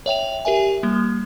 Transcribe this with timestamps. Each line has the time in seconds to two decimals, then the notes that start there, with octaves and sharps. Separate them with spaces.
0.06 C#5 E5 G5 F7
0.45 G4 A#4 E5 G#5
0.83 G3 A#3